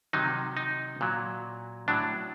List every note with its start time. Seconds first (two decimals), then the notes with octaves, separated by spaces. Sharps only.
0.13 C3 D#3 F#3 D#4
0.57 D#4
1.01 A#2 F#3
1.88 A2 F#3 D4